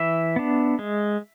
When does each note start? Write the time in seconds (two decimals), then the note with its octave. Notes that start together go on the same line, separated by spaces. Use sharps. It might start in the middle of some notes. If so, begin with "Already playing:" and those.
Already playing: E3 E5
0.36 B3 D4
0.79 G#3